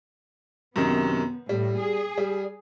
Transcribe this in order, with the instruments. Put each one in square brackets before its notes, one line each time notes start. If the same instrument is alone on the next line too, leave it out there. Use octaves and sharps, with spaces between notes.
[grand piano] F#2 C3 D#3 [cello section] B3
[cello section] A2 [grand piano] G3
[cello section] G#4
[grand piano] G3